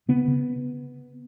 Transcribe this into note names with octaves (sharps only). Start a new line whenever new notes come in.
C#3 B3
C#3